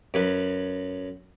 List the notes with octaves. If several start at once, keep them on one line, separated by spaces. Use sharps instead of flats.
F#2 F#3 B4